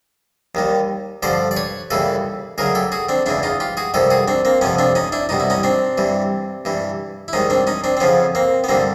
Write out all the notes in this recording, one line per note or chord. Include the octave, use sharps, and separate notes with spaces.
D#2 D#3 G3
G2 D3 F3 C5 D5
D5
B4 C#5
D#2 C#3 E3 G3 A4 B4
D2 C#3 F#3 G#4 A#4
G4 A4
F#4 G#4
C4 D4
E2 C#3 E3 D4 E4
D#4 F4
F4 G4
F#4 G#4
F2 C3 D#3 G3 G4 A4
F#4 G#4
C4 D4
A#3 C4
F2 C3 F3 B3 C#4
C4 D4
C#4 D#4
D4 E4
C2 B2 G3 D#4
E4
C#4 D#4
C4 D4
G2 E3 G3
G2 E3 G3
E4
G#2 D#3 G3 C#4 D#4
C4 D4
C#4 D#4
C4 D4
C4
F2 C#3 F3 B3 C#4
A#3 C4
B3
G2 D3 G3 A#3 C4